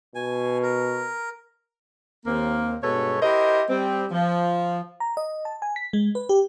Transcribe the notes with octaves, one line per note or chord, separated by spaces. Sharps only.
B2 G#5
A#4
D#2 A#3 C4
G2 B2 G#3 A4 B4 C#5
E4 G4 A#4 C5 D#5
G3 C4
F3
A#5
D#5
A5
G#5
B6
G#3
B4
G4